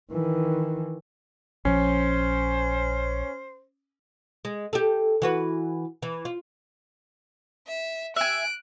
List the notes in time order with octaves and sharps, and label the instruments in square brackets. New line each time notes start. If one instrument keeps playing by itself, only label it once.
[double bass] D#3 E3
[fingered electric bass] A#1 F3 [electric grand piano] C#4 [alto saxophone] C5
[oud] G#3
G4 A4
E3 F#4 B4
E3
F4
[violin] E5
[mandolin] E5 G#5 [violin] F#6 D7